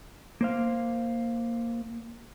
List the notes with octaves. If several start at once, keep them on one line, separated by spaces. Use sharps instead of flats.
A#3 C5 F5